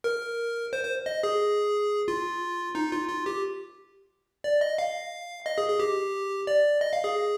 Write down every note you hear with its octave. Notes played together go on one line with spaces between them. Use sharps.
A#4
C5
C5
D#5
G#4
F4
D#4
F4
F4
G4
D5
D#5
F5
D#5
G#4
G#4
G4
D5
D#5
F5
G#4